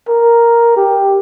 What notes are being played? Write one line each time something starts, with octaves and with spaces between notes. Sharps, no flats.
A#4
G4